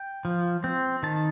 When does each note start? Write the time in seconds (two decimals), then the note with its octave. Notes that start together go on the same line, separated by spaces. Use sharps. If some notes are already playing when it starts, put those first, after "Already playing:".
Already playing: G5
0.25 F3
0.64 C4
1.03 D#3 A5